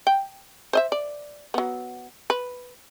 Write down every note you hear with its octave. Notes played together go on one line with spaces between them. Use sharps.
G5
C5 D#5 E5
D5
F#3 B3
B4